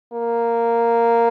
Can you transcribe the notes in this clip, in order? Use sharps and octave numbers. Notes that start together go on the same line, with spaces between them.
A#3